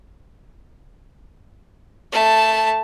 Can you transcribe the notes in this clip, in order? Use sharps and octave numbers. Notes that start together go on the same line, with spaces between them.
A3 A5